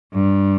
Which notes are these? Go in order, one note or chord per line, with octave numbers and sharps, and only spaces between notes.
G2